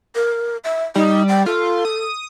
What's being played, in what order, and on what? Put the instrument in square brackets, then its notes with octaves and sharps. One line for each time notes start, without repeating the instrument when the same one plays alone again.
[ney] A#4
E5
[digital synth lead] G3 [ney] D#4
[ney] G5
[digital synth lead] F4 [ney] A4
[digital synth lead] D#6